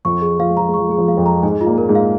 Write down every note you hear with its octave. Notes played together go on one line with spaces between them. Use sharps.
F2 F3 C#6
G#4
F3 F5
G#3
F3 A#5
G#3
F3 C#6
G#3 G#4
F3
G#3 F5
F2 F3
A#5
G#2 G#3 G#5
F4
A#2 A#3
A#4
G#2 G#3
F5